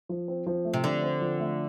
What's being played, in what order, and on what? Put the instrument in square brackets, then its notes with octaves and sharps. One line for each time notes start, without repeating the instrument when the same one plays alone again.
[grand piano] F3
C4
F3
A3
[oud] C3
[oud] D3 [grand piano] F3
[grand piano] C4
F3
A3